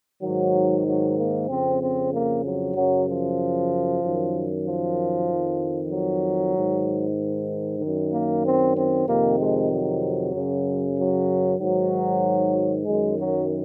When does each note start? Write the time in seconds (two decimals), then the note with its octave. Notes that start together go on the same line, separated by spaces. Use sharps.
0.22 G#2 D#3 F#3
0.86 F#3
1.17 A#3
1.48 F2 C#3 C4
1.81 C4
2.12 A#3
2.44 F#3
2.75 F#2 C#3 F#3
3.06 F3
4.01 F#2 D#3
4.64 F3
5.28 F2 D#3
5.91 F#3
6.54 G#2 D#3
7.80 F#2 D#3
8.11 A#3
8.43 C4
8.75 C4
9.06 F2 C3 D#3 A#3
9.38 G#3
9.70 F#3
10.32 F#2 C#3
10.96 F#3
11.59 G#2 D#3 F#3
12.85 F#2 D#3 G#3
13.17 F#3